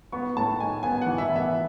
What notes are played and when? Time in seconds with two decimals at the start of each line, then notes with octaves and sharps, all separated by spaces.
0.12 B3 C#6
0.36 A2 A5
0.59 D#4 G#5
0.83 B3 G#5
1.01 E3 F#5
1.18 E5
1.30 B3
1.36 E5